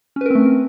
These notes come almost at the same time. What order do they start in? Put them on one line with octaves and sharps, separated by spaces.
C#4 B4 A#4 C4 A3